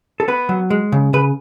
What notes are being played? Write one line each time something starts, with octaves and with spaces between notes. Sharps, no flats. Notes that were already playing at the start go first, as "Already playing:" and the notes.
A4
B3 B4
F#3
G#3
C#3
C#3 B4